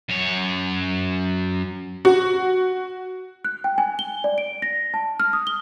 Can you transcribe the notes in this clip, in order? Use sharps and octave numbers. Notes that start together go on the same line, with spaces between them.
F#2 C#5
F#4
F#6
G5
G#5
G7
D5
D7
A#6
A5
F6
D#6
G7